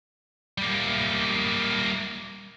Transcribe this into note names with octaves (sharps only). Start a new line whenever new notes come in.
G3 A#3